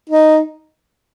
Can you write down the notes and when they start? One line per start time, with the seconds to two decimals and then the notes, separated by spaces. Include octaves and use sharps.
0.10 D#4